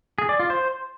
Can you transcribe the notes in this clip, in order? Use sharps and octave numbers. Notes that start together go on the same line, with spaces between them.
G#4
D5
F4
C5